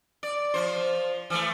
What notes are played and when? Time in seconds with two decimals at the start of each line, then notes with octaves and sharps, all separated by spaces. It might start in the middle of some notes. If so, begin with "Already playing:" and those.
0.23 D5
0.54 F3 C5
1.30 E3 A3